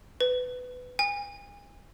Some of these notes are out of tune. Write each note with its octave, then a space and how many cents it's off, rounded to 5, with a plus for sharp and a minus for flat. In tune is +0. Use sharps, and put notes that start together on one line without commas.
B4 +20
G#5 -35